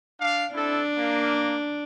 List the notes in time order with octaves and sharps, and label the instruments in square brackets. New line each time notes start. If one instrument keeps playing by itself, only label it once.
[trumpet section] D4 F5
[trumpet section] C4 E4 A4 [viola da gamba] D4
[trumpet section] A#3